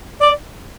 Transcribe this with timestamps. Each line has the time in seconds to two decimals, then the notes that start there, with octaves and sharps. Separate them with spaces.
0.21 D5